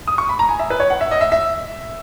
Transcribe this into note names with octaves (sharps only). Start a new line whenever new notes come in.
D#6
C#6
B5
A#5
G#5
E5
B4
C#5
F#5
E5
D#5
E5
E5